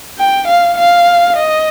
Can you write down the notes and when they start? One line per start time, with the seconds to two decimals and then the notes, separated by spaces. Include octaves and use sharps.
0.19 G5
0.48 F5
0.78 F5
1.37 D#5